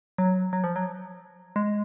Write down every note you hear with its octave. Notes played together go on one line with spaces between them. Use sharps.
F#3
F#3
F3
F#3
G#3